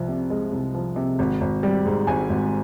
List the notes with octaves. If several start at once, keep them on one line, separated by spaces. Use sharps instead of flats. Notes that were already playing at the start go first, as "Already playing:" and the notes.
Already playing: C2 F3
C3
G#3
C2
F3
C3
G#1
G#1
G3
G#2
G#1 G#5
G#1